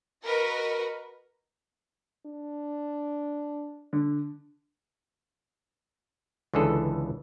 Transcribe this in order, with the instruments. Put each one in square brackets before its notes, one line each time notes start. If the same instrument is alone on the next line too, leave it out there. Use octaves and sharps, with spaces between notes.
[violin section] F#4 A#4 B4 D#5
[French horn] D4
[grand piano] D3
[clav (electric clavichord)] C#2 D3 E3 G#4 A4